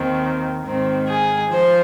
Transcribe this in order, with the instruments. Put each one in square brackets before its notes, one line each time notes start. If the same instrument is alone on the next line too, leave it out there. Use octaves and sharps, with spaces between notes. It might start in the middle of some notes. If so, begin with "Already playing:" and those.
Already playing: [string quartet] D#2 D#3 C4
G#2 D#3 C4
G#4
F3 C5